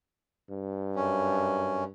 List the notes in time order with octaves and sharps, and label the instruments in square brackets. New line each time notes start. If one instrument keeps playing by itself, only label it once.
[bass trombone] G2
[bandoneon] F#2 C#4